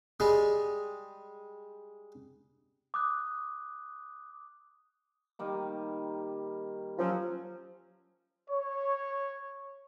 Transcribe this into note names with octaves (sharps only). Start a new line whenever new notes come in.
G3 G#3 G#4
D6 D#6 F#6
D#3 G3 A#3
F3 F#3 C#4
C#5